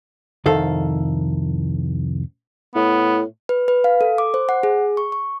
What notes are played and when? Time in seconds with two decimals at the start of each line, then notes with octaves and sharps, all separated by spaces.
0.46 C2 F2 D#3 A4 F5
2.75 A2 B3
3.49 B4
3.68 B4
3.84 F5
4.01 A4
4.18 D6
4.34 C5
4.49 F#5
4.63 G#4
4.97 C#6
5.12 C#6